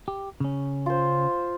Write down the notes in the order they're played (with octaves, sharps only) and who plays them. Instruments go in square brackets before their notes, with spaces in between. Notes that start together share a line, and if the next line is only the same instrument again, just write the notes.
[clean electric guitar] G4
C#3 C#4
[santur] F4 C5